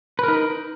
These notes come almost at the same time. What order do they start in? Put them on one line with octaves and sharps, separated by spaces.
B4 A#4 D#4